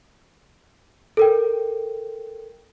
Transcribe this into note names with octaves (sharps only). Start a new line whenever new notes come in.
A4 A#4 G5